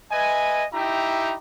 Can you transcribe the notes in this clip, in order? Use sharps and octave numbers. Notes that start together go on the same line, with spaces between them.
B4 D#5 E5 G#5
D#4 E4 G4 E5 G5 A#5